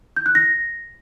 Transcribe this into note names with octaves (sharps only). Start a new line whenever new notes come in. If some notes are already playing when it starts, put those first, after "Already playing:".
G6
F#6
A#6